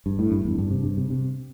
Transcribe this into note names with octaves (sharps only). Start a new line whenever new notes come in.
G2
A2
G2
E2
G2
C3
G2
C3
C3